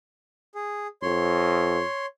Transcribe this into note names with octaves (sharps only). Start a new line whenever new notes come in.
G#4
F2 C#5 C6